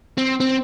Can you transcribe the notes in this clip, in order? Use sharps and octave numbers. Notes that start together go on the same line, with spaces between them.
C4
C4